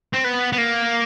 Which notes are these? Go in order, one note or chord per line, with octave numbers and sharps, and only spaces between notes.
C4
B3
B3
A#3